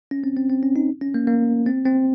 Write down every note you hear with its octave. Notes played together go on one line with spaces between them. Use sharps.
C#4
C4
C4
C4
C#4
D#4
C#4
A#3
A#3
C4
C4